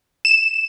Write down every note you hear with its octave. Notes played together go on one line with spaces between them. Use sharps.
E7